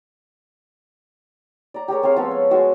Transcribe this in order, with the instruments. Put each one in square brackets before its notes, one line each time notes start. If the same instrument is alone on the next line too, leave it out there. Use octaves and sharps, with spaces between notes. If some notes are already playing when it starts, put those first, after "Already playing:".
[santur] D5 A#5
G4 G#4 A#4 C#5
C4 G#4 C#5 F5
F3 G#3 B3 A4
C#4
G#3 F#4 E6